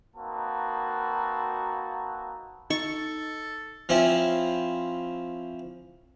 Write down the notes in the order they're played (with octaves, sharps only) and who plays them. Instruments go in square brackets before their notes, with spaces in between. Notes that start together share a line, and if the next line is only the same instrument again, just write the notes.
[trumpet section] A#3 C4 D#4 F#4 B4 A5
[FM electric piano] D#4 [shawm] A4 [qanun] C#6
[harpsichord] F3 C4 C#4 E4